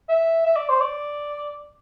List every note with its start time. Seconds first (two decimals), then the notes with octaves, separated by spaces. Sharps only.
0.09 E5
0.46 E5
0.56 D5
0.69 C5
0.81 D5